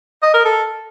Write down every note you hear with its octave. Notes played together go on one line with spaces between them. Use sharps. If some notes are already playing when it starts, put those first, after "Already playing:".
D#5
A#4
A4